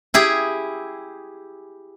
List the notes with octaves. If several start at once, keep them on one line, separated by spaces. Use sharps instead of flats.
E4 G4 G#4